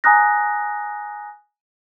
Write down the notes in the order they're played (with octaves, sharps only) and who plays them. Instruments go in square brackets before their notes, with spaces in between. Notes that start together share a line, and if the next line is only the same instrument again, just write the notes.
[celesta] G#5 A#5 D#6 F#6 A#6